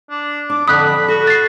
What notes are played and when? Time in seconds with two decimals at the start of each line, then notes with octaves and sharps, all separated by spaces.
0.10 D4
0.50 D4 D6
0.68 F2 D3 A5 B5 D#6 F#6
1.08 F#4 A4
1.27 A6 C7